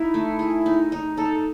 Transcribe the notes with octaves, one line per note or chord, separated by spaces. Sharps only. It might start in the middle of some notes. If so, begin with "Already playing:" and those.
Already playing: D#4 E4
A3
G#4
D#4
D#4
D#4 A4